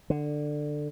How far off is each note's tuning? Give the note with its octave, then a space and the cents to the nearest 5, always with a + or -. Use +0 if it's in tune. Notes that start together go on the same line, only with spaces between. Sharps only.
D3 +15